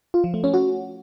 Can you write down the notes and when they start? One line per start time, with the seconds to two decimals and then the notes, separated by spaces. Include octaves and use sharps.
0.14 F4
0.24 F3
0.34 A3
0.44 C#4
0.54 F#4